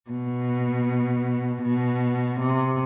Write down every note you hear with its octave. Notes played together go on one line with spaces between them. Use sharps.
B2
B2
C3